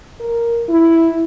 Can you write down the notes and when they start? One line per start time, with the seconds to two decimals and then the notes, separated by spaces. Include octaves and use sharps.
0.20 A#4
0.69 E4